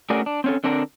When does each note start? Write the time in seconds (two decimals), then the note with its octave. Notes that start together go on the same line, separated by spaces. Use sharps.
0.10 A3 C#4 F#4 G#4 A#4 D5
0.26 D4
0.44 C4 C#4 A4
0.64 D3 C4 D4 A#4